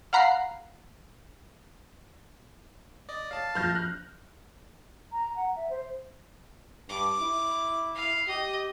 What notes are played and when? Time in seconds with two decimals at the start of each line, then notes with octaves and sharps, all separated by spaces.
0.13 F5 F#5 A#5 B5 F#6 C7
3.09 D5 D#5
3.31 C#5 F5 A5
3.55 A#1 F3 F4 F6 G6 A#6
3.75 F#6
5.12 A#5
5.36 F#5
5.55 E5
5.70 C5
6.89 G2 D6
7.22 E4
7.95 F5
8.28 G4 D#5